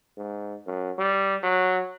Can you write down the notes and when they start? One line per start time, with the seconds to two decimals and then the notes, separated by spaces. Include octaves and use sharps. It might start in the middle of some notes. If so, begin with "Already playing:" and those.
0.17 G#2
0.67 F#2
0.98 G3
1.43 F#3